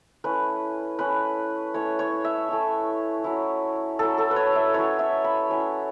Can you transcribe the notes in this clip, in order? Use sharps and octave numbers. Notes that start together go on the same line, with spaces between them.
A3 C#4 E4 B4
A3 C#4 E4 B4
A3 C#4 E4 C#5
C#5
E5
A3 C#4 E4
F#3 C#4 E4
F#3 C#4 E4 A4
A4
B4
C#5
E5
F#3 C#4 E4 C#5
E5
B5
F#3 C#4 E4